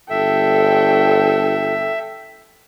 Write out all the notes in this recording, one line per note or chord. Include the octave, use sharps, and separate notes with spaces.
G1 A4 E5 G5